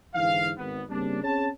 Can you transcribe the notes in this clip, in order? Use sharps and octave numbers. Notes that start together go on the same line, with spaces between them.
G#2 D3 E3 E4 F5
G#1 B3
C#3 G3 A#3 C4 D4
C4 C#4 G#4 C#5 A5